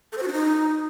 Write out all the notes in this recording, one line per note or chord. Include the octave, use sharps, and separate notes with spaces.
A4
C5
F#4
D4
D#4